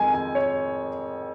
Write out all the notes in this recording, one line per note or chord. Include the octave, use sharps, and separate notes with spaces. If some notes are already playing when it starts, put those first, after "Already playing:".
Already playing: F2 D#3 G#3 G#5
G#5
C#5